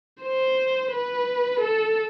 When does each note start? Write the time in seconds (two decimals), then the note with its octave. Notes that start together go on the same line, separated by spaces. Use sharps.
0.23 C5
0.92 B4
1.60 A4